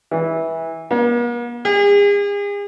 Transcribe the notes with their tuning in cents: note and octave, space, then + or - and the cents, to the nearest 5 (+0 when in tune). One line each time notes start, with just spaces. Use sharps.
E3 -15
A#3 +45
G#4 -40